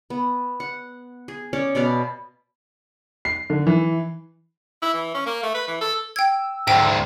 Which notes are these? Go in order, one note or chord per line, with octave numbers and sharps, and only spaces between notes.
B3
F#5
G#4
C#4 C#5 D5
B2 B3 D5 F5
C7
D3
E3
E4
E3
C#4
A#3
A3
B4
E3
A4
G5 E6 G#6
D2 G#2 G5